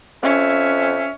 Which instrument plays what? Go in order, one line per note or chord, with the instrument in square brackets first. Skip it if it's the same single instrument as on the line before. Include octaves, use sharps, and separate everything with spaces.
[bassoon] F2 [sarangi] C#4 [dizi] E5